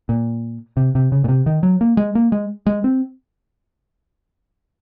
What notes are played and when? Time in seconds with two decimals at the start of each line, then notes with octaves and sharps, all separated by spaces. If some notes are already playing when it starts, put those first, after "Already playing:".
0.09 A#2
0.77 C3
0.95 C3
1.12 C#3
1.24 A#2
1.28 C3
1.46 D#3
1.63 F#3
1.81 A#3
1.97 G#3
2.15 A#3
2.32 G#3
2.66 G#3
2.84 C4